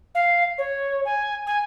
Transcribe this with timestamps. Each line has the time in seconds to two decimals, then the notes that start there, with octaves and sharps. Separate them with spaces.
0.14 F5
0.58 C#5
1.05 G#5
1.46 G#5